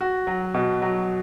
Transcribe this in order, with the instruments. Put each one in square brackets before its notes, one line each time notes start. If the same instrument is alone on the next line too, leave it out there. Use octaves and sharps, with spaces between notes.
[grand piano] F#4
F#3
B2
F#3